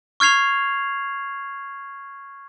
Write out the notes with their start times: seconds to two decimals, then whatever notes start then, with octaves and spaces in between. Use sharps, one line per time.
0.20 C#6 F6 G#6 C7 F7